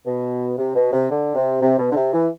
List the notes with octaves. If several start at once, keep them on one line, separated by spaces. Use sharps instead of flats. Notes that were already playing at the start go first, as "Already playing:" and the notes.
B2
C3
B2
C3
D3
C3
C3
B2
D3
C3
E3